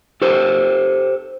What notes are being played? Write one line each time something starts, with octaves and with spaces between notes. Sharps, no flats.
G4 A4 C5